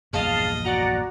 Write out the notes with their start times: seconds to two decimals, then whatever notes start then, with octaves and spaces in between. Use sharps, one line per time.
0.13 A#1 E2 G2 G#4 D#5 F5 A5 F6
0.65 F#4 D5 F#5 A#5